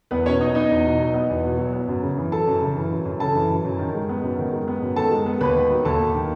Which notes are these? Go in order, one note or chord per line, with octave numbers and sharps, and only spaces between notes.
E2 B3 B4
B2 C#4 C#5
F#3 D#4 D#5
B3 D#4 D#5
E2
B2
F#3
B3
E2
B2
F#3
B3
F#2
C#3
E3
F#2 A4 A5
F#2
C#3
E3
F#2
F#2
C#3 A4 A5
E3
F#2
F#2
D#3
G#3
B3
F#2
D#3
G#3
B3
F#2
D#3 A4 A5
G#3
B3
D#2 B4 B5
D#3
F#3
D#2 A4 A5
D#2
D#3